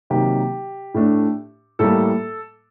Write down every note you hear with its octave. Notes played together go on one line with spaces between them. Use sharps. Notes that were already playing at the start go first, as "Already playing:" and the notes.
C3 D#3 F#3 A#3 G4
A2 A3 D4
A2 G3 A#3 A4